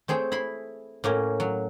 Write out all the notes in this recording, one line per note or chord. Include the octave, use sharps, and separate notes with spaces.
A3 C4 G#4 C#5 G5
E4 B5 C6
A2 A#3 C#4
F#3